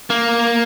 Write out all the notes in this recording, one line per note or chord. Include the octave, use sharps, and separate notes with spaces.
A#3